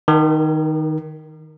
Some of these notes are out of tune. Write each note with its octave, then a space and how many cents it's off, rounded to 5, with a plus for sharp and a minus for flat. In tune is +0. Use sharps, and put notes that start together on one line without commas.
D#3 +0 A#4 +45